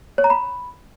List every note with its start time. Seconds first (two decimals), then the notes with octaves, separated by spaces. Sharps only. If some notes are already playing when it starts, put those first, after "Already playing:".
0.18 C#5
0.24 A#5
0.30 B5